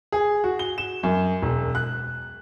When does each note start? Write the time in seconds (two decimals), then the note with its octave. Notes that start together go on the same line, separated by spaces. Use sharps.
0.12 G#4
0.44 F#4
0.59 G7
0.78 E7
1.03 F#2
1.42 E1
1.75 F#6